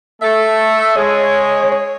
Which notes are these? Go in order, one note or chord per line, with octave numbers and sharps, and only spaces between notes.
A3 A4 E5
G#3 G#4 C#5
C#5